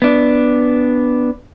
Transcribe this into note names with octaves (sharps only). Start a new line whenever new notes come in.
B3 D4